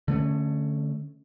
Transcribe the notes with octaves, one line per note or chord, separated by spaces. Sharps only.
D3 A3 A#3 C#4